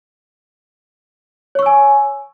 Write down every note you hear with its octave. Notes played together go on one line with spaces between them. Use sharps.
C#5 G#5 C#6 E6